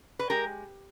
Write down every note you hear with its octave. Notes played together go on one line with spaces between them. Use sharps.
B4
G#3 G4 A#4